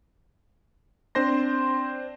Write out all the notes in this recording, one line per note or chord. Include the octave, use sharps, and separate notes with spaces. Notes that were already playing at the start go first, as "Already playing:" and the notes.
C4 D4 C5 C6 A#6